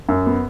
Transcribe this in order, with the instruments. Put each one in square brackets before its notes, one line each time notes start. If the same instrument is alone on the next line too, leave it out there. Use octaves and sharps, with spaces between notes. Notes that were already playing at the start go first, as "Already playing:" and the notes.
[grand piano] F#2
B3